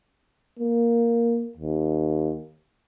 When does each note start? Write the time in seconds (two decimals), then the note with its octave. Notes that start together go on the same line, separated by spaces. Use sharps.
0.59 A#3
1.57 D#2